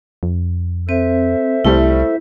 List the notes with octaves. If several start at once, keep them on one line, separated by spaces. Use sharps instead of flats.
F2
C4 A4 C5 E5
C2 G3 A3 C4 E4